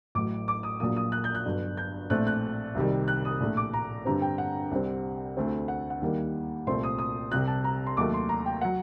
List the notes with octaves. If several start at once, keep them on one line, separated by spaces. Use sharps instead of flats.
A1 A2 F#3 D6
D6
D#6
A#1 A#2 F#3 A#3 D#6
D#6
F#6
G6
F#6
G1 G2 F#3
G6
A#1 A2 A3 C4 F#6
F#6
C2 C3 D#3 G3
F#6
D#6
A#1 A2 A3
D6
A#5
G2 D3 G3 C4 A#5
G5
F#5
C2 C3 G3 C4
D2 D3 A3 C4
F#5
F#5
D#2 D#3 G3 A#3
C2 A#2 A3 C4 C6
D#6
D#6
C2 C3 G3 F#6
A5
A#5
C6
D#2 D#3 F#3 A3 D6
C6
A#5
G5
F#3 F#5